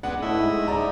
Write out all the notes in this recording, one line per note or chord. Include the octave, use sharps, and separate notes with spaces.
G#3 B3 D4 F#5
A2 E4 D#5 E5
G#2
G#2 D#4 D5 A#5